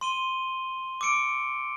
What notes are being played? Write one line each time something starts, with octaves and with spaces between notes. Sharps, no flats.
C6 D#7 G7
D6 E6 C#7 D7